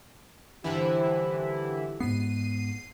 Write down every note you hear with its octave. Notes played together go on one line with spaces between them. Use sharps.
G2 D3 E3 F3 E4 G4
G#2 B3 C7 D#7